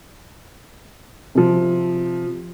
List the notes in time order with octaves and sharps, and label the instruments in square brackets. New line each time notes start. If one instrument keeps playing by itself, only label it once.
[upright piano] C3 F3